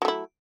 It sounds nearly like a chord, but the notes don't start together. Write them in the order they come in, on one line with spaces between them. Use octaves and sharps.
F#3 A3 E4